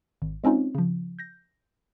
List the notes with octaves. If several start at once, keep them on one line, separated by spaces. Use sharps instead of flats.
G#1
G#3 C4 C#4 D#4 F4
C#3 F3
G6 A#6